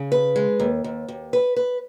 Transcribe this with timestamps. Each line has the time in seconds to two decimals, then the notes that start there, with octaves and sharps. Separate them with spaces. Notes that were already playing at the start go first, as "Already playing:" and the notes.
Already playing: C#3
0.12 B4
0.36 G#3
0.60 D#2
0.84 D#2
1.08 D#2
1.33 B4
1.56 B4